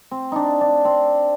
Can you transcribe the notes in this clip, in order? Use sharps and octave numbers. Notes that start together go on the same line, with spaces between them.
C4
D4 D#4
D4
C4